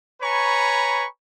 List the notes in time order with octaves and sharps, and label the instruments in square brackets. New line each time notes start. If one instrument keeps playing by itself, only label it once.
[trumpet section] B4 C#5 G#5 A#5 B5 C#6